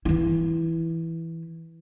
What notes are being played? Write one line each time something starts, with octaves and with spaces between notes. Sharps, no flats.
E3 E4